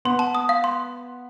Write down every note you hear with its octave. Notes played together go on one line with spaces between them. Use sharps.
B3 C6
A5
D#6
F5
C6